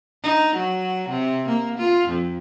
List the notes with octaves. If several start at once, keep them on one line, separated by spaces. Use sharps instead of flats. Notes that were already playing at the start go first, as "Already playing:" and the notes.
D#4
F#3
C3
A#3
F4
F2